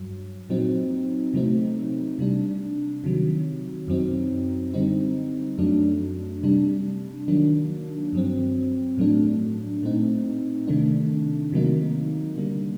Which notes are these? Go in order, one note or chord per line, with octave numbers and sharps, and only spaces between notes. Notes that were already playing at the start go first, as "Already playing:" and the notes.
Already playing: G2 F#3
A#2 F#3 C4 D#4
C3 F#3 A3 C4 D#4
C3 G3 D4
C3 D#3 F#3
F#2 F#3 C4 D#4
D3 G3 C4 D#4
F#2 F#3 A3 D4
C3 G3 D4
D#3 F#3 A#3 D4
G2 F#3 C4
A2 F#3 A3 D4
A#2 A3 C4 D#4
C3 D#3 A3 D4
C3 D#3 F#3 A#3 D#4
D3 G3 A#3 D4